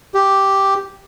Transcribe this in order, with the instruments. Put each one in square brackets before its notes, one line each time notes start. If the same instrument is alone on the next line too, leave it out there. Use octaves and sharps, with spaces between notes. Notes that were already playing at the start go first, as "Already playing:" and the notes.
[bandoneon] G4